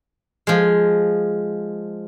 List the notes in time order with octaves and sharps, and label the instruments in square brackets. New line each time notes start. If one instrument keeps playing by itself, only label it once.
[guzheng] F3 G#3